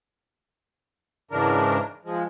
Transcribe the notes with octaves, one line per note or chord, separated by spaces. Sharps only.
G#2 C#3 E3 D4 A#4
F3 G#3